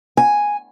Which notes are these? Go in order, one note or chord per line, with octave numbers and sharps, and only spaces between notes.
G#5